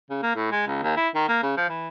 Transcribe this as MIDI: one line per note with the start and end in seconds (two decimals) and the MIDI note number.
0.10 0.18 49
0.23 0.35 58
0.36 0.49 45
0.52 0.62 56
0.67 0.79 37
0.83 0.95 39
0.96 1.09 64
1.15 1.24 51
1.28 1.38 58
1.43 1.56 49
1.57 1.69 53
1.69 1.88 52